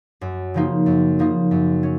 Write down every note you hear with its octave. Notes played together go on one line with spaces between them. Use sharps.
F#2
C#3 F3 A#3 D#4
F#2
C#3 F3 A#3 D#4
F#2
C#4